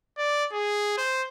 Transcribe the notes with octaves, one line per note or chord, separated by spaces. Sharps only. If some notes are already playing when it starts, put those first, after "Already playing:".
D5
G#4
C5